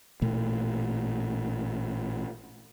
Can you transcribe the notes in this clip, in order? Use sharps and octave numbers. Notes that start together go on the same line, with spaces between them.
A1 A#2 A3